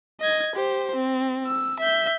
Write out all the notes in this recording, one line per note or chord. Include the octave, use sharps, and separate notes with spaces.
D#5 G#6
G4 C5
C4
E6
E5 G6